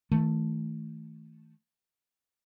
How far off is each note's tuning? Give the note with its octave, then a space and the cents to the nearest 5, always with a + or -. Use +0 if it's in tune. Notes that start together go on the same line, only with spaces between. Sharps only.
D#3 +45 A3 +5